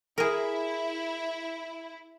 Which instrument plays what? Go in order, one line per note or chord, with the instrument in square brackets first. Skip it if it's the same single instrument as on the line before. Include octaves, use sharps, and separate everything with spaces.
[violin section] E4 [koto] G#4 A#4